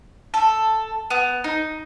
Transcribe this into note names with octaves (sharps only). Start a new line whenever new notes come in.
A4
B3
D#4